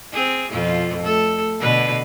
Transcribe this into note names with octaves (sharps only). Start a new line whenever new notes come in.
C4 G#4
F2 B2 F4
A3 A4
B2 D3 B4